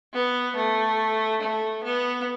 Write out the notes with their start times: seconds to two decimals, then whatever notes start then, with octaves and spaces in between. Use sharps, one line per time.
0.13 B3
0.56 A3
1.41 A3
1.84 B3